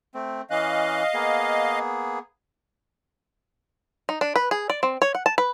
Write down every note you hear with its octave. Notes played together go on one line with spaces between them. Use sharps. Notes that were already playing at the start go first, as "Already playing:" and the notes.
A3 C4
E3 C#4 D#5 F5 F#6
A#3 B3 G#4
D#4
D4
B4
G#4
D5
C4
C#5
F#5
A5
B4